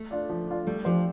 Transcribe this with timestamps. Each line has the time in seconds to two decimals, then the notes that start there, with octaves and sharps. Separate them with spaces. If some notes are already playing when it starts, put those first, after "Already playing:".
Already playing: A3
0.11 D4 F4 D5
0.30 F3
0.48 D4 F4 D5
0.67 G3 A3
0.85 F3 D4 G4 C5